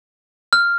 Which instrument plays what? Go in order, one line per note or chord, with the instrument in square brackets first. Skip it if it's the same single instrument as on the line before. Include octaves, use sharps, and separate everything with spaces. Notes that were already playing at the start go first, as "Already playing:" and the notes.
[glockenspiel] F6